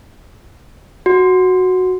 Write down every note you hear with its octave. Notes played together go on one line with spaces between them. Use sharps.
F#4